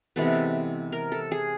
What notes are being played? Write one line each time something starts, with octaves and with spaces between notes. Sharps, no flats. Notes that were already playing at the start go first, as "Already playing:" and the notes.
C3 E3 G#3 B3 A4
A#4
A4
G#4